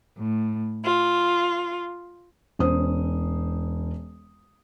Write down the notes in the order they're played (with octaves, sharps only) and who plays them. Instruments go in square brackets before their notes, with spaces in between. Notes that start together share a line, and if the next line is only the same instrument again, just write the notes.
[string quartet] A2
F4
[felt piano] E1 C#4 C5 D#6